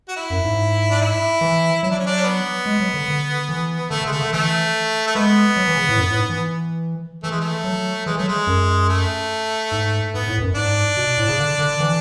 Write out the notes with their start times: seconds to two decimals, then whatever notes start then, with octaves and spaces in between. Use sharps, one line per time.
0.08 F#4
0.16 E4
0.30 F#2
0.45 G#2
0.91 D4
1.01 E4
1.41 E3
1.83 F#3 E4
1.91 D4
1.99 C#4
2.06 D4
2.18 C#4
2.24 B3
2.66 G#3
2.80 F#3
2.94 D3
3.08 D3
3.49 E3
3.91 D3 A3
4.01 D3
4.06 G#3
4.11 C#3 A3
4.22 D3
4.32 E3 A3
5.07 A3
5.15 G#3 B3
5.57 F#3
5.68 E3
5.77 C#3
5.89 A2
5.98 F#2
6.09 A2
6.19 G#2
6.30 E3
7.23 E3 A3
7.31 G#3
7.40 A3
7.64 F#3
8.06 E3 G#3
8.18 F#3 A3
8.28 G#3
8.47 F#2
8.89 A3
9.72 G#2
10.14 G#2 B3
10.27 A2
10.37 E2
10.42 F#2
10.55 G#2 D4
10.97 B2
11.18 A2
11.28 C#3
11.39 D3
11.59 D3
11.80 E3